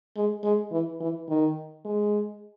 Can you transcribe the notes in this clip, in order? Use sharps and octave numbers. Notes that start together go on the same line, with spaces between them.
G#3
G#3
E3
E3
D#3
G#3